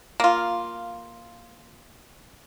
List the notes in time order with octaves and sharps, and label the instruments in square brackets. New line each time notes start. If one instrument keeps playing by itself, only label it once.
[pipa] A#3 F4